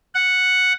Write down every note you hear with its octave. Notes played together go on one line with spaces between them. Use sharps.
F#5